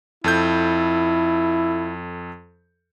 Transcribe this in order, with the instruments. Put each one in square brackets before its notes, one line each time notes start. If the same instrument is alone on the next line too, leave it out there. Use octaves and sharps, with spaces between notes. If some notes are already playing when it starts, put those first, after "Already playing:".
[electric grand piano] F2 A4 G6 [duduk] E4